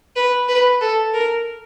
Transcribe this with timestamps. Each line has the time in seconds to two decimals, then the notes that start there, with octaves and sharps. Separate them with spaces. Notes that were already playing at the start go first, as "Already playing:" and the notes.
0.16 B4
0.48 B4
0.81 A4
1.14 A#4